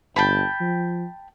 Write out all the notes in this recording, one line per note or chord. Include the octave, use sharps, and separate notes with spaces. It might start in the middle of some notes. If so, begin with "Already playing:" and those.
G1 G5 A5 B5
F3